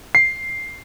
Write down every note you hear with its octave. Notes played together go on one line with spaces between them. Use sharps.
C7